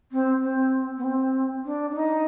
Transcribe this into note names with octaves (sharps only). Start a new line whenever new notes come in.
C4
C4
B3
C4
D4
D4
D#4